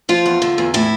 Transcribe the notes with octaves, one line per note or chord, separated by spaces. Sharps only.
F3 F4
E2
D3
E2
A2 E4